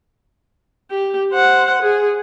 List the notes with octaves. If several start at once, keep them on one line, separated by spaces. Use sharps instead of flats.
G4
C5 F#5
G#4